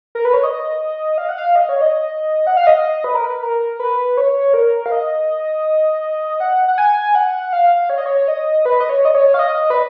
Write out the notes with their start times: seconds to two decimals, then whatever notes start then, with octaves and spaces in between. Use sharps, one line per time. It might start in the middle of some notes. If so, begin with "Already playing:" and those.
0.15 A#4
0.25 B4
0.34 C#5
0.43 D#5
1.18 F5
1.29 F#5
1.38 F5
1.55 D#5
1.69 C#5
1.81 D#5
2.47 F#5
2.57 F5
2.67 D#5
3.04 B4
3.14 A#4
3.24 B4
3.43 A#4
3.80 B4
4.17 C#5
4.54 A#4
4.86 F5
4.92 D#5
6.40 F#5
6.68 F#5
6.78 G#5
7.15 F#5
7.53 F5
7.90 C#5
7.98 D#5
8.06 C#5
8.28 D#5
8.65 B4
8.80 D#5
8.89 C#5
9.05 D#5
9.15 C#5
9.34 F5
9.39 D#5
9.70 B4